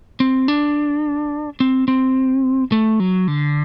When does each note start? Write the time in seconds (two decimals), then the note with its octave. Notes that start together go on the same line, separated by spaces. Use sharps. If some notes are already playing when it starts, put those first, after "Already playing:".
0.20 C4
0.48 D4
1.60 C4
1.88 C4
2.72 A3
3.00 F#3
3.28 D3